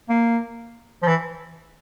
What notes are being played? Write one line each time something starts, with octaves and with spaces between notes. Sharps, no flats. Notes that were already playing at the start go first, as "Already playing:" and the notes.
A#3
F3
E3